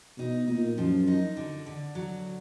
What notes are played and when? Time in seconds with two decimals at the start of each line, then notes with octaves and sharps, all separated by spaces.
0.18 B2 D#4
0.47 A#2 D#4
0.77 F#2 F3
1.07 D#4
1.37 D3
1.66 D3
1.95 F#3